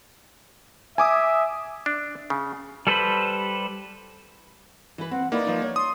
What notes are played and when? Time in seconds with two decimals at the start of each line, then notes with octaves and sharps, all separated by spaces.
0.98 E5 G#5 D6 D#6
1.86 D4
2.30 C#3
2.87 G3 A4 B4 C5 B5
4.98 E3 B4
5.11 C4 F#5
5.32 A#3 D#4 E4 B4 D5
5.47 F3 D#4
5.62 C#5
5.76 C6 D#6